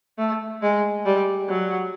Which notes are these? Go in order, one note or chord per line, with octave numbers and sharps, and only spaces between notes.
A3
G#3
G3
F#3